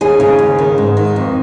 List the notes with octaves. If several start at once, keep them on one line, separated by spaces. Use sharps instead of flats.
D#2 G#4
C#3
D#2
D#3
G#2
D#3
F2